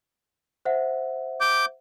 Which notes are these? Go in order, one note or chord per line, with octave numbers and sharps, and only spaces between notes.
C5 E5 F#5
D6 G6